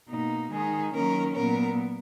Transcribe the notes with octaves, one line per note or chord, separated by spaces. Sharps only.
B2 A#3 D#4
D#3 G#3 D#4 G#4
D#3 F#3 A#3 C#4 A#4
A#2 F#3 B3 A#4